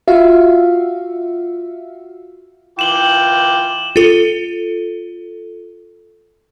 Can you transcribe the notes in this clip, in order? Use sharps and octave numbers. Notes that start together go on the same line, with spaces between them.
F4 F#4 E5 F5
E3 F4 G5 D6 E7 F#7 G7
F4 A4